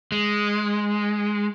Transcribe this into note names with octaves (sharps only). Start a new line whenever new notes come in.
G#3